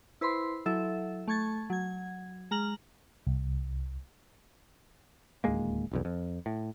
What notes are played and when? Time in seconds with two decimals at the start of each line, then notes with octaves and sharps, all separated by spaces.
0.21 E4 B4 C5 B5 C6
0.66 F#3 E4 A4 E5
1.28 A3 C#6 G#6 A6
1.70 F#3 G#6
2.51 G#3 A#5 F6 F#7
3.27 C2
5.44 D1 D#2 G#3 A#3
5.91 F1 B1 E2
6.05 F2
6.46 A2